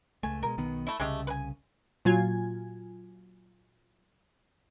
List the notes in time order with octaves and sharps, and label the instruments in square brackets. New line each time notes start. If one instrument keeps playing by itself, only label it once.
[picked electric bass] C#2 A3 [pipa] G#5
[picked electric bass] B2 G3 G#3 [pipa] A#4
[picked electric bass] B1 D#3 B3
[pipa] A3 E4
[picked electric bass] C2 C#3 [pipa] G#3 A3 G4
[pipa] B4 G#5
[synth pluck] A#2 F#3 F4 G#5 G#6